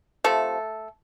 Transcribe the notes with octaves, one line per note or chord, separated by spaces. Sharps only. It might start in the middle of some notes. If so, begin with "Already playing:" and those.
C3 F3 A3 A4